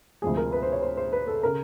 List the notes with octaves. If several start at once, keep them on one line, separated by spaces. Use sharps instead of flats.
D2 C3 F3 G#3 G#4
A#4
B4
C5
C#5
C5
C5
B4
A4
C#3 A#4